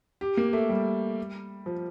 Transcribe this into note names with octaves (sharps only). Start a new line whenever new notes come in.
G4
A#3
A3
G3
F3